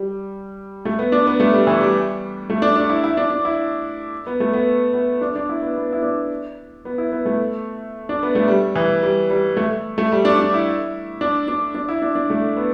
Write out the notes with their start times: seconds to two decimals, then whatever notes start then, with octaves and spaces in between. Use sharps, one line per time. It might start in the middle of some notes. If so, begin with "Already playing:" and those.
Already playing: G3
0.85 A3
0.99 B3
1.12 D4
1.27 B3
1.40 A3
1.53 G3
1.67 E3
1.81 G3
2.50 A3
2.62 D4
2.76 D4
2.89 E4
3.04 E4
3.17 D4
3.30 D4
3.45 E4
4.27 B3
4.40 A3
4.53 B3
4.94 B3
5.21 D4
5.36 D4
5.49 E4
5.62 B3
5.76 B3
5.93 E4
6.03 D4
6.85 B3
6.98 E4
7.12 B3
7.26 A3
8.09 D4
8.23 B3
8.35 A3
8.48 G3
8.76 E3
9.03 G3
9.30 G3
9.57 A3
9.98 A3
10.12 G3
10.25 D4
10.39 D4
10.53 E4
11.21 D4
11.48 D4
11.75 D4
11.89 E4
12.02 D4
12.15 D4
12.30 A3
12.57 B3